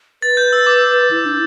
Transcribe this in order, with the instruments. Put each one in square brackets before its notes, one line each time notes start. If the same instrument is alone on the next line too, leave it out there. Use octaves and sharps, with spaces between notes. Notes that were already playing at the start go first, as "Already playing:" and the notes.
[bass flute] B4 [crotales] A6
[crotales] G6
E6
D6
[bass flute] E4
D4